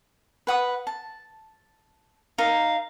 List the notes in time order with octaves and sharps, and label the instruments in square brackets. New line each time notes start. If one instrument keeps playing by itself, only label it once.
[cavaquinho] B4 F#5 D#6
A5
[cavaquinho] D#4 A#4 [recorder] F5